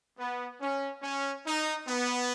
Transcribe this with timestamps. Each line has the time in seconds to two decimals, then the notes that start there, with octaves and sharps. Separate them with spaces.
0.18 B3
0.61 C#4
1.03 C#4
1.46 D#4
1.88 B3